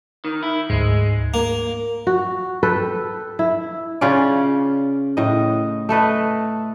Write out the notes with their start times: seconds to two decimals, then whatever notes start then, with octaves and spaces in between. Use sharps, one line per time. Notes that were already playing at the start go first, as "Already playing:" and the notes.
0.25 D#3
0.43 E4
0.70 D2 G#2 G#3
1.34 A#3
2.07 F#4
2.63 A4 B4 G5
3.39 E4
4.01 C#3 C#4 F4 D5
5.17 A2 D#5
5.89 A3 A4 B4 D#5